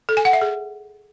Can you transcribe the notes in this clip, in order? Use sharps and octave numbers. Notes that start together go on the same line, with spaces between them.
A4
G#5
F#5
E5
G#4